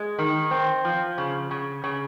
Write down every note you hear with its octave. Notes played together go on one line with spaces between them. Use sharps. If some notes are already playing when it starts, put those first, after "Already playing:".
Already playing: G#3
D#3
C4
F3
C#3
C#3
C#3